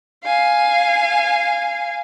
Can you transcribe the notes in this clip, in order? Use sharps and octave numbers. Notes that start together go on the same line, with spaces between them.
F5 G#5